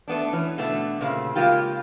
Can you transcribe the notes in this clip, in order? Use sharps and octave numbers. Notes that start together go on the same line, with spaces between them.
A3 B3 D4
E3 C#4
B2 D3 A3 B3
A#2 C#3 C4
C#3 G#3 A#3 F4 G4